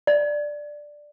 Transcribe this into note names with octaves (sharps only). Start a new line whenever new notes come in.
D5